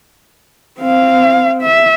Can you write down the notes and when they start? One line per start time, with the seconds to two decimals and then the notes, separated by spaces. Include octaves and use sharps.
0.79 C4 F5
1.62 E5